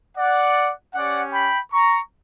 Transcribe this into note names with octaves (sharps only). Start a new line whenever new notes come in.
D5 F#5
C#4 G4 D5 F#5
G5 B5
A#5 C#6